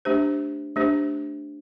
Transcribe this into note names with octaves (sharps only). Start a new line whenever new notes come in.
A3 D4 G4 C5
A3 D4 G4 C5